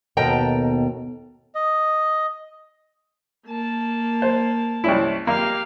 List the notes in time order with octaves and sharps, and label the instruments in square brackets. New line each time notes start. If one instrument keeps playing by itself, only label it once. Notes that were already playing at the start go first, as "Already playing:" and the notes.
[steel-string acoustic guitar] D#2 B2 A4 G5 A#5
[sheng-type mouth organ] D#5
[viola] A#3 A5
[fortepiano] C5
C2 C#4 E4
[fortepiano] A#3 [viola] G4 F5